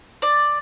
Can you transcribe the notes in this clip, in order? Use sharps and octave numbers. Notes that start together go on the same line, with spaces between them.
D5